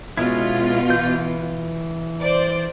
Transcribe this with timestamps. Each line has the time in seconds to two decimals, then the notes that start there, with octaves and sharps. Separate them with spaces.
0.17 B2 G#3 C#4 E4 F4
0.90 E3 B4 G6
2.21 C5 D5